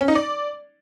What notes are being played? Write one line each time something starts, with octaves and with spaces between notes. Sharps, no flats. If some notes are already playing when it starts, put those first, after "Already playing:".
C#4
D#4
D5